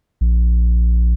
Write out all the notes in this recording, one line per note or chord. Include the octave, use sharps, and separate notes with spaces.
A#1